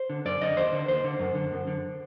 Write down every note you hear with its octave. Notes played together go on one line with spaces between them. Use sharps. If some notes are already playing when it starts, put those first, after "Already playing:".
Already playing: C5
D3
F#2 D5
D3 D#5
D#2 C5
D3
D#2 C5
D3
F#2
D3
F#2
D3